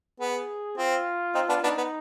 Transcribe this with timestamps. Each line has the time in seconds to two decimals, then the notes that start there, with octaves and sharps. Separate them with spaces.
0.20 B3 G#4
0.78 C4 F4
1.35 C4 D#4
1.49 B3 D4
1.63 B3 D4 D#4
1.78 B3